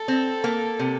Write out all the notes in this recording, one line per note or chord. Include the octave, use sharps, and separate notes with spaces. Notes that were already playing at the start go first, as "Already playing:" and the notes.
Already playing: A4
C4
A#3
C3